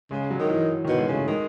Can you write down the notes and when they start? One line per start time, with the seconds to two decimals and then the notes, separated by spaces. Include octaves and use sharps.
0.11 C#3 G#3
0.30 F#3
0.39 D#3
0.50 E3
0.84 B2 D#3
0.98 G#3
1.09 C#3 A3
1.28 D#3 G#3